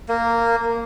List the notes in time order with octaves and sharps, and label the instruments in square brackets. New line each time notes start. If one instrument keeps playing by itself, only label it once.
[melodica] A#3